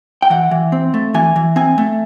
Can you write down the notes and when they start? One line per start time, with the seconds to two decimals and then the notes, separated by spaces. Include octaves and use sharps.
0.22 G5
0.30 E3 F#5
0.51 E3
0.72 C4
0.94 A3
1.14 E3 G#5
1.36 E3
1.56 C4 G#5
1.78 A3